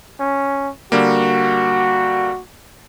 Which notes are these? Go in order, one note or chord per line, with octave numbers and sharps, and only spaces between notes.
C#4
D3 G3 A#3 F#4